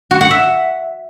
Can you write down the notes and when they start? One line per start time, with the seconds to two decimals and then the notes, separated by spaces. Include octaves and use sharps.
0.11 F#4
0.21 F#5
0.31 E5